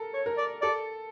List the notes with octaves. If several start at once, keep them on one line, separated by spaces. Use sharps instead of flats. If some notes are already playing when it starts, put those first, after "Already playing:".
Already playing: A4 A#4
C#5
A#4
D5
A4 D5